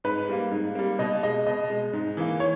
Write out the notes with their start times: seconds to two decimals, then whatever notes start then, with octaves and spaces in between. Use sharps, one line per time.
0.04 G#2 B4
0.29 G3 A#3
0.51 G#2
0.75 G3 A#3
0.99 B2 D#5
1.23 G#3 D#5
1.47 B2 D#5
1.70 G#3
1.93 G#2
2.17 E3 A#3
2.40 C#5